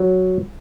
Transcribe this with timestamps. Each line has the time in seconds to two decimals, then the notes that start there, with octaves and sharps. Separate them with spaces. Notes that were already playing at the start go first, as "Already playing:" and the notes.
Already playing: F#3